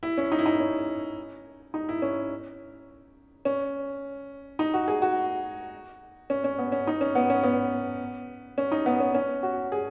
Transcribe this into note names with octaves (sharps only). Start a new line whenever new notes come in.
E4
C#4
D#4
E4
D#4
C#4
D#4
E4
C#4
C#4
D#4
F#4
G#4
F#4
C#4
C#4
B3
C#4
D#4
C#4
B3
C#4
B3
C#4
D#4
B3
C#4
C#4
F#4
G#4